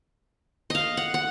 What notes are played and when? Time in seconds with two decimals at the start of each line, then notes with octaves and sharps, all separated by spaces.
0.70 D#5 F5
0.97 F#5
1.14 F#5